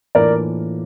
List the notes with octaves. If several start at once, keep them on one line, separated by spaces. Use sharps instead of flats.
A2 E3 A#3 D4 F4 A#4 D5